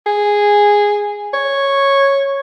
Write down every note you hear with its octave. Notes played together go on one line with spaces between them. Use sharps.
G#4
C#5